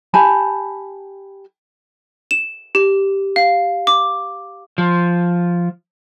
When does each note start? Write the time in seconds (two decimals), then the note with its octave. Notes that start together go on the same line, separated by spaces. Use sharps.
0.14 G4 G#5 A5 B5
2.31 E7
2.75 G4
3.36 F5
3.87 D6
4.78 F3